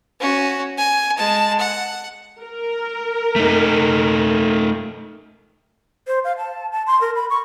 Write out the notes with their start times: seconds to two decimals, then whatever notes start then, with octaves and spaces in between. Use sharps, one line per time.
0.21 C#4 F#4
0.77 G#5
1.18 G#3 A5
1.59 F#5
2.41 A#4
3.36 A3 D#4
6.07 C5
6.24 F5
6.37 A5
6.72 A5
6.87 C6
7.01 A#4
7.15 B5
7.30 C#6